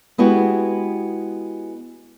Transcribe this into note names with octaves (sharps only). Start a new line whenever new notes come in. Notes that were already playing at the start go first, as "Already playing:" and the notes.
G#3 B3 E4 F#4 G4